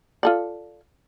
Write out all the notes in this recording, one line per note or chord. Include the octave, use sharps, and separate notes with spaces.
F4 A4 D5